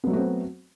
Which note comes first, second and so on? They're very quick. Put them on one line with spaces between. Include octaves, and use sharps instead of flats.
B3 F#3 A3 F#4 C4